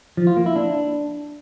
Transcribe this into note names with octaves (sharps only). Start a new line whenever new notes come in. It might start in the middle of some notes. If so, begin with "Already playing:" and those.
F3
F4
A#3
E4
D4